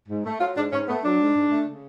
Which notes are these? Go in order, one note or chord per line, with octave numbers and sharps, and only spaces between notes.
G#2
A3
F#3 F4
G#2 D4
G#2 C#4
A3 B3
F#3 D4
G#2
G#2
A3
C#3